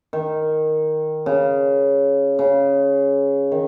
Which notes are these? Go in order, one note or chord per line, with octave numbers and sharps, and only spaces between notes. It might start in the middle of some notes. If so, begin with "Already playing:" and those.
D#3
C#3
C#3
D#3